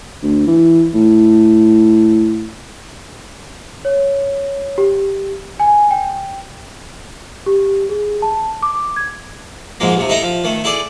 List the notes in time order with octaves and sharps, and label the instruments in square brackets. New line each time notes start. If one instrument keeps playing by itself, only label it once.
[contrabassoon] D2
E3
A2
[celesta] C#5
G4
G#5
G5
G4
G#4
A5
D6
G#6
[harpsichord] G#2 F3 G#3 A#3
D#2 C3
D#4 E4 A4 A#5
F3
D#3 A3
E4 G#4 A4 D5